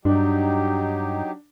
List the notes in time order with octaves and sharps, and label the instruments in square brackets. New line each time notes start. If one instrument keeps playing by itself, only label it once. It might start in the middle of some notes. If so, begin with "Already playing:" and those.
[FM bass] G2 [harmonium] F#3 D#4 G4 [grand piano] D4